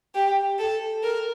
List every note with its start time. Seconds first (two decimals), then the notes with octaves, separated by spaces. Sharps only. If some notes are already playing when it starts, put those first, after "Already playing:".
0.15 G4
0.59 A4
1.03 A#4